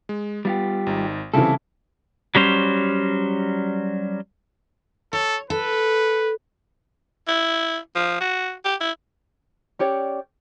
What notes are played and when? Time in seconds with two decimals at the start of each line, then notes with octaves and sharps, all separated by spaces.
0.09 G#3
0.45 G3 B3 F4 G4
0.86 G#1 D#4
1.34 C#3 E3 G3 C4 E4 A4
2.35 F#3 G3 C#4 C5
5.13 A4 C#5
5.50 A4 B4
7.28 E4
7.95 F3
8.20 F#4
8.65 G4
8.80 E4
9.79 C#4 G4 C#5 D5